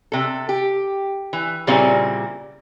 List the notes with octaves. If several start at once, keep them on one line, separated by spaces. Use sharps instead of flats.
C3 A4
G4
E3
A#2 C#3 G3 A#3 C4 E4